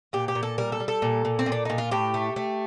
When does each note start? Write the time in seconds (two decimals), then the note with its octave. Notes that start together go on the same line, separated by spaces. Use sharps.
0.13 A#2 G4
0.28 G4
0.35 A#2
0.43 A4
0.58 G3 A#4
0.72 A4
0.80 G3
0.88 A4
1.02 A#2
1.25 A#2
1.39 C4
1.46 A#2
1.52 D4
1.65 A#2 D#4
1.78 F4
1.91 A2 G4
2.14 A3
2.36 A3